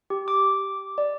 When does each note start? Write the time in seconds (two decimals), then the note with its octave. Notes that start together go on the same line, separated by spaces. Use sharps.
0.10 G4
0.28 D6
0.98 D5